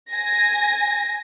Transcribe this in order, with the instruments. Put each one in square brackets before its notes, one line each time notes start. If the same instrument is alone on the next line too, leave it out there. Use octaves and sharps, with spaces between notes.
[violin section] G#5 A#6